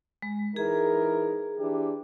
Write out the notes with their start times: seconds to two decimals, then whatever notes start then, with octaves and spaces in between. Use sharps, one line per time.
0.22 G#3
0.56 E3 D#4 G#4 A#4
1.59 E3 D4 G4